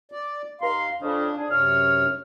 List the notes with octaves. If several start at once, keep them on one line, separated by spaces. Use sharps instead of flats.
D5
D#2 F5 A#5 C6
F2 C#3 D4
D4 G#4
F#2 C3 C#5 F6